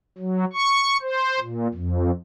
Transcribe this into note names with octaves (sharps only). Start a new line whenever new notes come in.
F#3
C#6
C5
A#2
F2